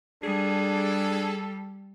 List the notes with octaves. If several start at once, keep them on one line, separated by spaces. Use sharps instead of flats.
G3 D4 G#4 A4